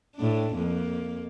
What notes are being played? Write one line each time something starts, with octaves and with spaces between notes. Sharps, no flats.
A2 D4
F2 A#3